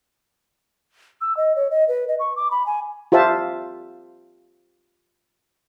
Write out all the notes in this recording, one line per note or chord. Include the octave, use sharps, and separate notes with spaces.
E6
D#5
C#5
D#5
B4
D#5
C#6
D6
B5
G#5
F4 G4 C5 E5 A5